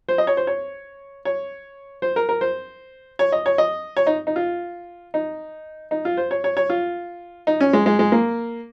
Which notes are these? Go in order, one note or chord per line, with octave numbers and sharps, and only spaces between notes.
C5
D#5
C#5
C5
C#5
C#5
C5
A#4
A#4
C5
C#5
D#5
C#5
D#5
C#5
D#4
D#4
F4
D#4
D#4
F4
C5
C#5
C#5
C#5
F4
D#4
C#4
G#3
G#3
G#3
A#3